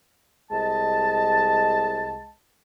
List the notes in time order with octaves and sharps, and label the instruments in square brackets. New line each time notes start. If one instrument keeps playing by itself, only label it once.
[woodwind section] C2 G#3 D#5 A5